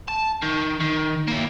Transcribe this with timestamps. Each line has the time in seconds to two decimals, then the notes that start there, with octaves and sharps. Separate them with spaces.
0.08 A5
0.42 D#3
0.80 D#3
1.28 A#3 E4